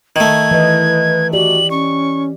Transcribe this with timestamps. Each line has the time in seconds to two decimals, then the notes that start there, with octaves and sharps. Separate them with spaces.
0.16 D#3 A3 G#6
0.51 E3 B4 D#5
1.33 F#4 G4 D5 F#7
1.71 C#4 C#6